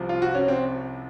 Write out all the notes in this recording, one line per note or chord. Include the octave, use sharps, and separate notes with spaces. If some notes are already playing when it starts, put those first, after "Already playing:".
Already playing: C2 C3 F3
F4
F#4
C#4
C4